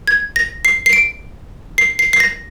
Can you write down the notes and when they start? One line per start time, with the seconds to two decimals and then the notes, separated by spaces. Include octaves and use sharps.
0.07 G#6
0.36 A#6
0.65 C7
0.86 C7
0.93 D7
1.78 C7
1.99 C7
2.13 C7
2.20 A#6